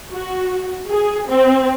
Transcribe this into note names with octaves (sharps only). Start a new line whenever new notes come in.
F#4
G#4
C4